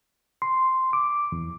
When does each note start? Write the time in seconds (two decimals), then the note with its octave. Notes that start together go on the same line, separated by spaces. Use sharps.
0.42 C6
0.93 D6
1.32 E2